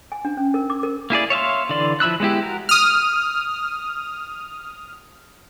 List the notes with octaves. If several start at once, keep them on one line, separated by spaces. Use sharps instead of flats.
G#5
D4
C#4
A#4
D6
A#4
A#3 E4 G#4 D5
C#5 E5 F5 C6
D3 E3 D5 C6
F3 E4 B5 E6 F#6
G#3 B3 E4 G4
F#4 A#4
D#6 F6